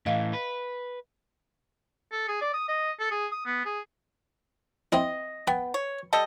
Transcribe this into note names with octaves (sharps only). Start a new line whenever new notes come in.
A2 E3 D#5 F5
B4
A4
G#4
D5
D#6
D#5
A4
G#4
D#6
B3
G#4
C4 E4 D#5
B3 G5
C#5
G3 A4 D#5